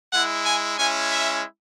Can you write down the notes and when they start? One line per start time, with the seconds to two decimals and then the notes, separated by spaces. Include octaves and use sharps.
0.13 G#3 E4 F#5
0.46 G#5
0.79 G#3 C#4 E4 G#5
1.11 E5